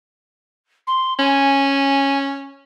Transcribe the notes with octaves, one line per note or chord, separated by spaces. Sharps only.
C6
C#4 G#5